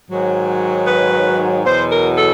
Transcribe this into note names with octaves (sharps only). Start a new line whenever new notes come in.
G#2 D#3 F#3
B4
E2 B2 F#3 C5
A#4
A4